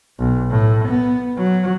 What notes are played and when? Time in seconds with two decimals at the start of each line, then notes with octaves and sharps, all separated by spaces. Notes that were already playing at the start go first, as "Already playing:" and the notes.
0.19 B1
0.50 A2
0.88 B3
1.38 F#3